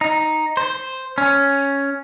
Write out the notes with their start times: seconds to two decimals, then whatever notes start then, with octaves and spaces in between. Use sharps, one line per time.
0.01 D#4
0.57 C5
1.18 C#4